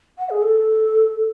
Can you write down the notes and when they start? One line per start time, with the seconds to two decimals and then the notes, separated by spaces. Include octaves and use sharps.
0.18 F#5
0.30 G#4
0.42 A4